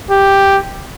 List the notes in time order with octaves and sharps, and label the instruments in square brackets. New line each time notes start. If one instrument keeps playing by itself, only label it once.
[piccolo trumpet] G4